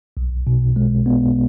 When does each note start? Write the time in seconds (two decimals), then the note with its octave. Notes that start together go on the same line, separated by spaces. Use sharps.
0.17 B1
0.47 B2
0.76 G#3
1.06 B3